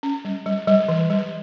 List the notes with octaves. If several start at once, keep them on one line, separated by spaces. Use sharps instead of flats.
C#4
G3
G3
G3
E3
G3